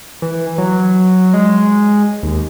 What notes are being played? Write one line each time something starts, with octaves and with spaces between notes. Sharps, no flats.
E3
F#3
G#3
D#2